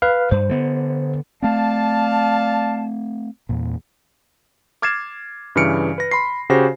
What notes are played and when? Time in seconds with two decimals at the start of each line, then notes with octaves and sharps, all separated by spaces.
0.02 B4 F5
0.31 G2 C5
0.49 D3 B3
1.42 A3 C4 D5 F5 A5
3.49 E2 A#2
4.82 D6 F6 G#6 A6 C7 E7
5.56 G2 C#3 E3 F6 C#7 D7
5.98 B4 A#6
6.11 B5 C6 C7
6.50 C#3 F#4 G4 C5 A#6